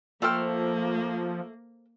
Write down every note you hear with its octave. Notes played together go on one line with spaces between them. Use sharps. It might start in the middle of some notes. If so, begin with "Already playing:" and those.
F3 A3 A#3 A4 C5 G5 F6